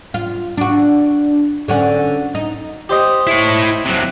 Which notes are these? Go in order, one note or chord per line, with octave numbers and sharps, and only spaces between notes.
F4
D4 F#4
D3 C#4 F#4
D#4
G4 C5 D#5
E4 C#5
C3 F#3